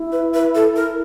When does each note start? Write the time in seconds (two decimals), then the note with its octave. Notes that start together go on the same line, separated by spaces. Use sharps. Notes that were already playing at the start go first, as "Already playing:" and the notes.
Already playing: E4
0.12 B4
0.34 B4
0.55 A4
0.76 A#4